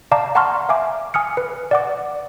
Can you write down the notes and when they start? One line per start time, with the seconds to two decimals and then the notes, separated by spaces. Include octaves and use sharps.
0.11 D5 F5 A5 A#5 D6
0.35 F#5 A5 A#5 C6 C#6 F6
0.69 E5 F5 G#5 D6
1.14 G#5 D#6 F6 C#7
1.37 B4
1.71 D5 F#5 D6